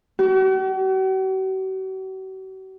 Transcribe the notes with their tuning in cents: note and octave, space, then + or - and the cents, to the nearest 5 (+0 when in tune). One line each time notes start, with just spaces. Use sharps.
F#4 +45